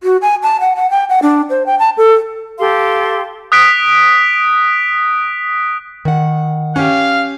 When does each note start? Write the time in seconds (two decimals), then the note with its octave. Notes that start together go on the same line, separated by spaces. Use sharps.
0.03 F#4
0.22 G#5
0.43 A5
0.60 F#5
0.76 F#5
0.90 G5
1.09 F#5
1.22 D4
1.50 C5
1.66 G5
1.79 A5
1.97 A4
2.59 G4 A4 F5 C6
3.52 D#6 F#6 B6 D7
6.05 D#3 F#5
6.76 C#4 G4 F5